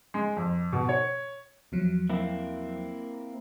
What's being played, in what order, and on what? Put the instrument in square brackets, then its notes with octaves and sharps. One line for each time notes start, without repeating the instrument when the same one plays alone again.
[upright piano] G#3
F2
B2
C#5
[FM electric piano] E2 F3 F#3
[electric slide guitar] A#3 C4 E4